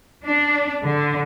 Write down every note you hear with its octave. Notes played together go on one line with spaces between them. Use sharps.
D4
D3